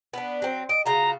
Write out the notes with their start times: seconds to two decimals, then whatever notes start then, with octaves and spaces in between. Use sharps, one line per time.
0.14 B3 D4
0.42 F#3 C4
0.69 D#5 D7
0.86 C#3 F4 F#4 A#5